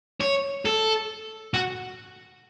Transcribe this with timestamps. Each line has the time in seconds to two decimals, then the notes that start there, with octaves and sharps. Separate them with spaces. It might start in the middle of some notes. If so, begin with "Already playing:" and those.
0.20 C#5
0.65 A4
1.54 F#4